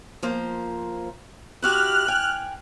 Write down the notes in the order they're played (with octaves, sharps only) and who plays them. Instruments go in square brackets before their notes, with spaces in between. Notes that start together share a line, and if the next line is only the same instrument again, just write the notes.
[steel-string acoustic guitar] F3 A#3 C5
[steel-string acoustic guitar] E4 F#4 G4 [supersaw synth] F6 F#6
[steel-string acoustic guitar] G5 G#5